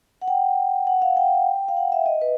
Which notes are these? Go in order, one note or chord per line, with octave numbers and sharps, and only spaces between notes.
F#5
G5
F#5
F5
G5
F5
F#5
E5
D#5
B4